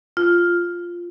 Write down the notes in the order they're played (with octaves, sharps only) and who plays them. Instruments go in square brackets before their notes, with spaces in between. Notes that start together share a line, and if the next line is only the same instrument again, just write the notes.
[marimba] F4